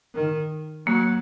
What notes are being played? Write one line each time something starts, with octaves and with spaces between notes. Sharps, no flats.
D#3
F#3 A#3